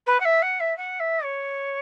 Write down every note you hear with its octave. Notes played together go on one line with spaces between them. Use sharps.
B4
F#5
E5
F#5
E5
F#5
E5
C#5